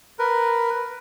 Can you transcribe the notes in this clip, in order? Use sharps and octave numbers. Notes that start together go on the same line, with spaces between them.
A#4 B4